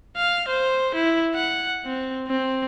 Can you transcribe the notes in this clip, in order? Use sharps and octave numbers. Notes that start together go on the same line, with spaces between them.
F5
C5
E4
F#5
C4
C4